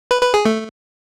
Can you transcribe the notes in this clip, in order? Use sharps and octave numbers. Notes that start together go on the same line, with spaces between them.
B4
B4
G#4
A3